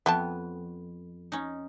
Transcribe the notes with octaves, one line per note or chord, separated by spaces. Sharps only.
F2 B3 E5 G5 A5
C#4 D#4